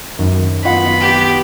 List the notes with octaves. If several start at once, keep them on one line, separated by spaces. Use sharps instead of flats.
F#2 D#3
B3 F4 F5 F#5 B5
G4